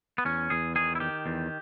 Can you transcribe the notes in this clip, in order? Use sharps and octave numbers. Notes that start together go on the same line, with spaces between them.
B3
E2 C#4
E2 G#4
D#3 G#4
E4
D#3 G4
E2